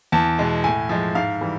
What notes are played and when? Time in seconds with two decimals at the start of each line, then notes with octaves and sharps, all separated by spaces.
0.12 E2 A5
0.39 B2 G#3
0.64 A2 G#5
0.89 F3 G#3
1.15 G#2 F5
1.41 E3 G3